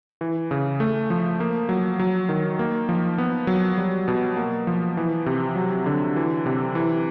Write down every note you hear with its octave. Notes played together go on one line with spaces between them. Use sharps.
E3
C#3
A3
F3
A#3
F#3
F#3
D#3
A#3
F3
B3
F#3
G3
B2
A#3
F3
E3
C3
F#3
D3
E3
C3
E3